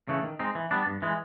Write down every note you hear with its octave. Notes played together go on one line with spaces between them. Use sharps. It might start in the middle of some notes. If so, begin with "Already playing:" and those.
C#3 E3 A3
D#3
G#3 C4 D#4
E3
G3 B3 D4
G2
E3 G#3